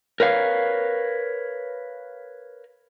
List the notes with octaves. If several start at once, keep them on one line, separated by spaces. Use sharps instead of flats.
A#4 B4 C#5 F5